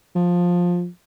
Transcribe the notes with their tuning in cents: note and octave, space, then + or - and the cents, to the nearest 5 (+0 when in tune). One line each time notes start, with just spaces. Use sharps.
F3 +15